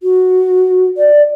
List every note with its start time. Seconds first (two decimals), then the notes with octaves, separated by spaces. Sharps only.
0.03 F#4
0.97 D5